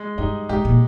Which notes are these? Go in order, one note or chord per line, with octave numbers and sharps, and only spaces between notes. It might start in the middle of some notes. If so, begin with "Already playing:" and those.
Already playing: G#3
G2 D#4 G4
G#2 D#4 G4
A#2